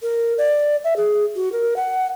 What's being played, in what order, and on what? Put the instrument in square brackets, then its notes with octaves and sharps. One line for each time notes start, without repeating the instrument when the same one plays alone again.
[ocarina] A#4
D5
E5
G#4
F#4
A#4
F#5